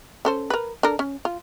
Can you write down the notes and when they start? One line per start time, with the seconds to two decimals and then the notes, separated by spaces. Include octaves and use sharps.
0.25 C#4 A4 C5
0.50 A#4 B4
0.83 D4 A4 A#4
0.99 C#4
1.25 F4